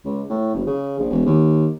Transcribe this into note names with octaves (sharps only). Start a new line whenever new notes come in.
C#2
A2
F#1
C#3
A#1
E1
D#2